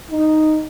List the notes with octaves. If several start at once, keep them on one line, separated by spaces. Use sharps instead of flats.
D#4